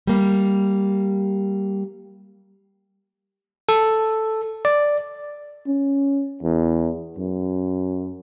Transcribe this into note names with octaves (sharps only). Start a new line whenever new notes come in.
G3 A#3
A4
D5
C#4
E2
F#2